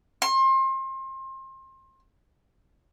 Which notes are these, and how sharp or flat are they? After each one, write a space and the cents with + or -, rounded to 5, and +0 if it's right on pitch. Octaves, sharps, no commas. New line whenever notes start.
C6 +30